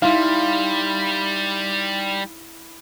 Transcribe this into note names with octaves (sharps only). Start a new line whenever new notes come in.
G3 D#4 E4 F5 B5 C6